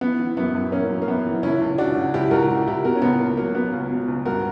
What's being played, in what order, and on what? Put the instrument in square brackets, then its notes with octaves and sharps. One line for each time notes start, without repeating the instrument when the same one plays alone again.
[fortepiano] E3 B3
E3
F#2 B3
F#2
E3 A#3 C#4
F#2
A#3
F#2 B3
E3
C#2 C#4 E4
C#2
C#3 D4 F#4
C#3
C#2 E4 G4
C#2 F#4 A#4
C#2
C#2 E4 G4
B2 F#4 A#4
C#4
C#2 B3
C#2 A#3
F#3 A#3
F#3 B3
C#2
B2
C#2
G2 F#4 A#4